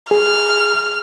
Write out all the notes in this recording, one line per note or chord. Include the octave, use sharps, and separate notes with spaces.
G#4 F6